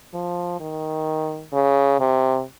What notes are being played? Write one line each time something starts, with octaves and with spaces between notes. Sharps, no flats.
F3
D#3
C#3
C3